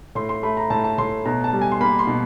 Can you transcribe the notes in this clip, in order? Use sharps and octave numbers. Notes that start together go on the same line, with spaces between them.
A2 C6
C6
A3 B5
A#5
A2 A5
A5
A2 C6
B2 A#5
A5
G3
G#5
C6
A#3 B5
C6
B2